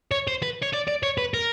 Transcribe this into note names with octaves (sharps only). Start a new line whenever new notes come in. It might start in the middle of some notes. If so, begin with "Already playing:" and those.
C#5
C5
B4
C#5
D5
D5
C#5
B4
A#4